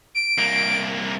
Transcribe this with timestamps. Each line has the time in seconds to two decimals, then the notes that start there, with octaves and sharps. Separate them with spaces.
0.15 D7
0.38 C2 A#3